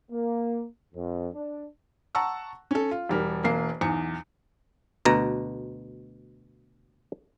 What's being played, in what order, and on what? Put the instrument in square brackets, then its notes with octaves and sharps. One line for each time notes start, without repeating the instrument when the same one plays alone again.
[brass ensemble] A#3
F2
D4
[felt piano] F#5 A5 A#5 C#6 E6
C#4 A4
F4
E1 G3 A#4
E1 A#3 C7
B1 E2 C#7
[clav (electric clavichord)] D2 B2 A#5